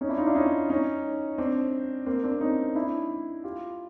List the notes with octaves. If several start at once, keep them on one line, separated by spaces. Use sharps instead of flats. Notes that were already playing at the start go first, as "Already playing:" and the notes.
C#4 D#4
D4 E4
D#4 F4
D4 E4
C#4 D#4
C#4 D#4
C4 D4
A#3 C4
C4 D4
C#4 D#4
D4 E4
F4 G4